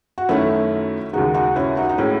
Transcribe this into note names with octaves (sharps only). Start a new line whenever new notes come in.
F#4
F#2 D#3 A3 C#4 E4
D#2 C#3 G#3 D#4 F#4
D#4 F#4
C#4 E4
D#4 F#4
D#4
A2 G#3 C#4 E4